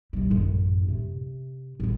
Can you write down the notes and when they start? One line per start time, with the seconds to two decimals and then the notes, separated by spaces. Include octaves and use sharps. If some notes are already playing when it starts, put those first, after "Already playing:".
0.13 C3 G3
0.30 A1 F#2
0.88 C3
1.80 A1 D#3